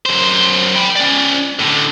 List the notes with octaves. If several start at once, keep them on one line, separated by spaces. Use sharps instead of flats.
F#2 C5
G5 B5
C#4 D5
A2 D3